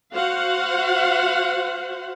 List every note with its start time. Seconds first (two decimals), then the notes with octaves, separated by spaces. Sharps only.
0.12 F#4 C5 F5 F#5